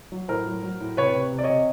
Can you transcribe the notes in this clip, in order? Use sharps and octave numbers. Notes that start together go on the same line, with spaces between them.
F#3
A2 A#4 C5
F#3
F#3
A2
C3 B4 C#5
C3
C3
D5
C#5 D#5
C3